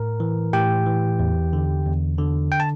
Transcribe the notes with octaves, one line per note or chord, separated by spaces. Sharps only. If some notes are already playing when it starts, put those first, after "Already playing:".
Already playing: A2 A#4
E3
A2 G4 G5
E3
E2
D3
E2
D3
G5
A5